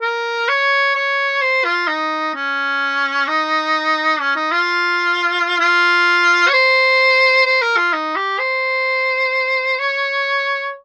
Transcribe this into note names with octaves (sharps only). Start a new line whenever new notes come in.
A#4
C#5
C#5
C5
F4
D#4
C#4
D#4
C#4
D#4
F4
F4
C#5
C5
C5
A#4
F4
D#4
G4
C5
C#5